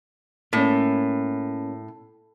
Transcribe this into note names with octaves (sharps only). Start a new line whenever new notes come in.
A2 A#3 C#4